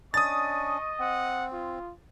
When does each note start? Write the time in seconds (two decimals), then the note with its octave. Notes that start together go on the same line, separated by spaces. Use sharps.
0.14 C#4 D4 D#5 C#6 D#6 A6
0.99 C4 F#5
1.53 F4